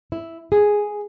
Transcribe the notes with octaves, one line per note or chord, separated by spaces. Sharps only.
E4
G#4